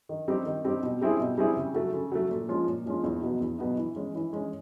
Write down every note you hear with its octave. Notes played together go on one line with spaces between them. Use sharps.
D#3
G3 C4 D#4 G4
D#3
G3 C4 D#4 G4
B2
G3 C4 E4 G#4
B2
G3 C4 E4 G#4
C#3
F#3 A3
C#3
F#3 A3
A#2
F3 G#3 C#4 F4
A#2
F3 G#3 C#4 F4
E2
B2 F#3 B3 D#4
E2
B2 F#3 B3 D#4
E3
G#3 C#4
E3
G#3 C#4